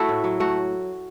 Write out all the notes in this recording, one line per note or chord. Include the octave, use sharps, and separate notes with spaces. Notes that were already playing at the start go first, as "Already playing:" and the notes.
Already playing: A3 E4 F#4 A4
A2
F#3
A3 F#4